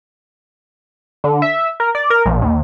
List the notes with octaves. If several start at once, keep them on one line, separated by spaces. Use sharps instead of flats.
D3
E5
A#4
D5
A#4
A#1
D#2